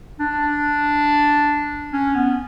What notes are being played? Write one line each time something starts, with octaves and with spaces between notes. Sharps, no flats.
D4
C#4
B3